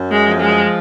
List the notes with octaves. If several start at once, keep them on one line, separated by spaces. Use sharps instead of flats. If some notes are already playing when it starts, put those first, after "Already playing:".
Already playing: F#2
G#3
F3
G#3